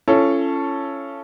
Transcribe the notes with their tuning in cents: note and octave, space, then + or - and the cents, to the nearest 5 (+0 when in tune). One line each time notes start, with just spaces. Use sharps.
C#4 +0 F4 -45 A4 +0